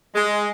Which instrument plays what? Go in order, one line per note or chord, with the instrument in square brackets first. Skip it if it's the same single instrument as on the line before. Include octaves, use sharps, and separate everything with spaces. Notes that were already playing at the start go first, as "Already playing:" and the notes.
[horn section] G#3